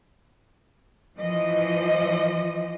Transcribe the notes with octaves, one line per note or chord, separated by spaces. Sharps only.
E3 F3 D#5